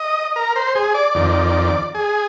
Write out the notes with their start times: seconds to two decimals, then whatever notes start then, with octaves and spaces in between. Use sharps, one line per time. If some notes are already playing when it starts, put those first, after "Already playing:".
Already playing: D#5
0.36 A#4
0.56 C5
0.75 G#4
0.94 D5
1.15 F2 D#3
1.95 G#4